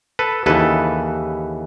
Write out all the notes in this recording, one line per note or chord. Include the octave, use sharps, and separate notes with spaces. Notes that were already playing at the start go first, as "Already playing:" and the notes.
A4 B4
D#2 C#3 E3 A4 B4